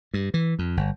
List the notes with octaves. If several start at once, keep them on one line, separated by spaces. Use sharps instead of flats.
G2
E3
F2
G1